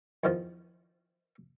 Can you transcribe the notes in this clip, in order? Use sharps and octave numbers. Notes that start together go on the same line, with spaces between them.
E2 D#3 F3